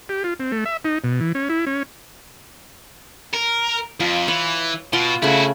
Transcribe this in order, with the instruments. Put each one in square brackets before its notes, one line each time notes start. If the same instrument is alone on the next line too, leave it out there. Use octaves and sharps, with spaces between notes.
[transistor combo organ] G4
F4
C4
A3
E5
D#4
B2
E3
C#4
E4
C#4
[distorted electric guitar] A#4
[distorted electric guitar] F2 [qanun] F4
[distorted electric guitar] E3 [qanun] C#5
[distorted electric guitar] B2 [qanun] F4 F#5 C6
[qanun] C#3 A3 [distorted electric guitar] E4 F#4